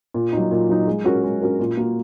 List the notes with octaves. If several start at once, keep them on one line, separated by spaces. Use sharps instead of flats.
A#2
F#3 D#4
A#2
F#3 D#4
G#3
C#4 F#4 A#4
G#3
C#4 F#4 A#4
A#2
A#3 F#4 A#4